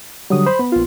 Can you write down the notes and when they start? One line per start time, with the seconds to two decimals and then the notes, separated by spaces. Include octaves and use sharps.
0.30 D3 F#3 G3 D#6
0.46 C5 B5
0.59 B3
0.72 A#1 F4